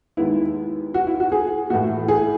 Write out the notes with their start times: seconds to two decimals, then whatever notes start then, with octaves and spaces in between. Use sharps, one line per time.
0.17 D#2 D#3 G#3 B3 E4
0.94 F#4
1.07 E4
1.20 F#4
1.32 G#4
1.70 A2 E3 A3 F#4
2.08 G#4